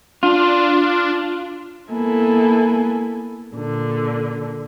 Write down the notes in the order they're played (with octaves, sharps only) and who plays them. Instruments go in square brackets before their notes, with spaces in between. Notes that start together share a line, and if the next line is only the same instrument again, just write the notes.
[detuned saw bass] D4 [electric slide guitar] F4
[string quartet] A#3 B3 E4 A4 G#5
A#2 D3